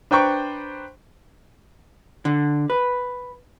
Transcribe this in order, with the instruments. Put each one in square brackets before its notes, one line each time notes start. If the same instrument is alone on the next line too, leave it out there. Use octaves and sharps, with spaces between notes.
[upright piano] D4 B4 C5 G5 A#5 C#6
[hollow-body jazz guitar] D3
B4